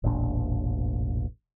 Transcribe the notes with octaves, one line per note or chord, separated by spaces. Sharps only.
E1 A1 A#2 D4